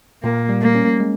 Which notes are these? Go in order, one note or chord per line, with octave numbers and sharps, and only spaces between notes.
A#2 A#3
G3
A#3
C#4
G#3